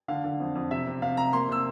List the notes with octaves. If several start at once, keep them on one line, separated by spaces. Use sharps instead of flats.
D3 F5
D3
F2
F2
C3 E5
C3
C3 F5
C3 A#5
A#3 C6
C3 E6